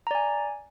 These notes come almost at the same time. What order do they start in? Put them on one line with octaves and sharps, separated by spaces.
A#5 D5 G#5